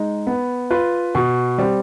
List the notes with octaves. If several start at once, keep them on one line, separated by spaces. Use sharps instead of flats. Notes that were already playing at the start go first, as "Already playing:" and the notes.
Already playing: G#3 D#4
B3
F4 B4
B2
G3 C4